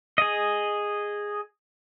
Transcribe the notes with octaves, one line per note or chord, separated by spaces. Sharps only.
G#4 D#5